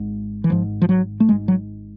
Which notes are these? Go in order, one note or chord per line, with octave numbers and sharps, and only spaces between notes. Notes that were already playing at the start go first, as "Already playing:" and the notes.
Already playing: G#1 G#2
E3
G#1 G#2 F3
F3
F#3
A3
G#1 G#2 G#3
F#3